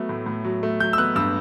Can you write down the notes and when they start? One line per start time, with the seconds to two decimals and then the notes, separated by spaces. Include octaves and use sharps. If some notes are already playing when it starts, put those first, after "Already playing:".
Already playing: F#3 A3 B3
0.09 A2
0.26 A2
0.45 F#3
0.63 A3
0.80 F#3 G6
0.93 E6
0.98 B3 F#6
1.15 G2 E6